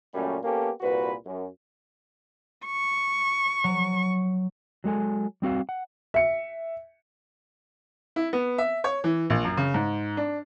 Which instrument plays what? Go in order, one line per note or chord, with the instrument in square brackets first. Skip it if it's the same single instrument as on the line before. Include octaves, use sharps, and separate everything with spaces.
[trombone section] F#2 A#2 G3 A3 C#4
A#3 B3 C#4 G4 A4
C2 A#2 F#4 B4
F#2
[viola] C#6
[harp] F#3
[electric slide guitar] F#3 G#3 A4 G#5
G3 C4 F#4 F5
F#5
[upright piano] E5 C#7
[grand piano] E4
B3
E5
C#5
E3
A#1
F#2
C#3
G#2
D4